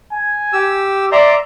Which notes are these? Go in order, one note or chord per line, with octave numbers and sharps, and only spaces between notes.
G#5
G4 E6
D5 E5 A#5 C6